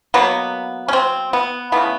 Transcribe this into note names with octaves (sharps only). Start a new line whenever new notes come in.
B2 F#3 A#3 B3
C#4
C4
B3
C#3 E3 A3 B3